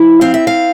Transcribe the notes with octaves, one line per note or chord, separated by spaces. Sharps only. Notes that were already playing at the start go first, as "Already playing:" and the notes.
Already playing: F3 E4
C4 F5
E5
F5